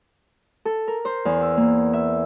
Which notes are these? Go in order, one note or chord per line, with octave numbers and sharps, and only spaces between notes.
A4
A#4
C5
E2
E6
A#3
E5